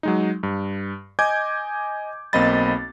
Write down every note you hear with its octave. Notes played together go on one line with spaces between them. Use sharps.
F#3 G#3 D#4
G2
D#5 G#5 D6 G6 G#6
B1 A#3 C4 D#5 B5 A6